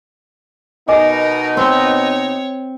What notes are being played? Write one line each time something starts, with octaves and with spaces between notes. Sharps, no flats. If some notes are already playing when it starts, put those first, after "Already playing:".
B2 B3 D#4 A#4 D#5 G#5 D6
C4 C#5